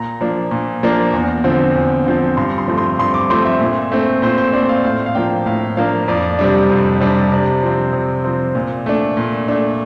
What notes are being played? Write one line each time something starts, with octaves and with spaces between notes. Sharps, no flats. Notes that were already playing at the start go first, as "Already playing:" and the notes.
Already playing: A#2 A#5
F3 A#3 D4
A#2
F3 A#3 D4
E2
D3 F3 C4
E2
D3 F3 C4
G2 C6
C6
F3 A3 C4
C6
G2 C6
D6
F3 A3 C4 C6
E5
A#2
A3 C4
A#2 C5
C5
A3 C4 D5
F5
A2 F5
F5
F3 A#3 D4 G5
A2 F5
F3 A#3 D4 F5
F2 D5
C3 G3 D4
F2
C3 G3 D4
C3 D5
F3 C4
C3
F3 C4
A#2
A3 D4
A#2
A3 D4